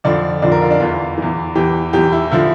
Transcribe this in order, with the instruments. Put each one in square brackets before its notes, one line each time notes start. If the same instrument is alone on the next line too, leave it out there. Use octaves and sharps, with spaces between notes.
[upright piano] F2 D3 F3 D5
F2 D3 F3 D5
A#4
F4
D4
E2 E3 F4
E2 E3
E2 E3 G4
E2 E3 G4
E4
D3 F3 E4